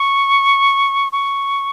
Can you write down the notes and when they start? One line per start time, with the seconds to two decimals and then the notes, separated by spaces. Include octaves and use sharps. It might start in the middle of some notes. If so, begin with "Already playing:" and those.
Already playing: C#6
1.12 C#6